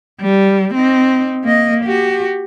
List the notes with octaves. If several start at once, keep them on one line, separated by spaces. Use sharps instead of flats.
G3
C4 D#4
A#3 D#5
F#4 G4